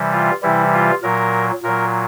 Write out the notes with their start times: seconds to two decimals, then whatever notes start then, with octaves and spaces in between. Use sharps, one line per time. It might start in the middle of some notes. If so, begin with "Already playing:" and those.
Already playing: C3 E3 G3
0.12 F4
0.43 C3 E3 G3 E4
0.73 F4
1.03 A#2 F#3 A#4
1.63 A#2 F#3 A#4